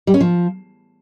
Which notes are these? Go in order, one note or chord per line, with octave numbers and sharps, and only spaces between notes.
G3
C#4
F3